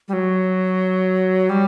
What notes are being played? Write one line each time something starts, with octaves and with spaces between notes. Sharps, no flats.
G3
F#3
G3